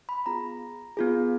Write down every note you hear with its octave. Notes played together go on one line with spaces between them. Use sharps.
B5
B3 F4 G#4 A#5
B3 F4 G#4